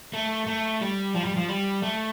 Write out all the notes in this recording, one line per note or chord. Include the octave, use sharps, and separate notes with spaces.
A3
A3
G3
F3
G3
F3
G3
A3